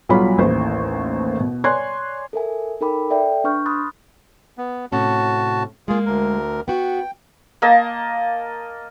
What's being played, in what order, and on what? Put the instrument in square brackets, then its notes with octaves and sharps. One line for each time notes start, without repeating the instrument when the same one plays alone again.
[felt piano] B1 F#3 G3 F4 C#5 B5
A1 D#2 A2 C5
B2
C#5 D5 G#5 C6 F#6 G#6
[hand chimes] A4 A#4 E5 G#5
D#4 A4 A#4 G5 B5 D6
A4 D5 E5 G5
D4 B4 C#6 F6 G6
B5 C6 D#6 F6 F#6 A6
[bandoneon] B3
[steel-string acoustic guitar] A2 C3 C#4 [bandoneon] F#4 A5
[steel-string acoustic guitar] G#3 A#3 [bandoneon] F4 G#4
[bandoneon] D2 A#4
[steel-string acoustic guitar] B3 F#4 [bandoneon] G5
[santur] A#3 D#5 A5